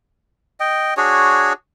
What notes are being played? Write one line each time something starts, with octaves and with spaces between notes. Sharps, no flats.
D#5 G5
D4 F#4 G#4 C#5